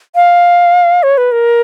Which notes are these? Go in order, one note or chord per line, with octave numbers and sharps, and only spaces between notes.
F5
C#5
B4
A#4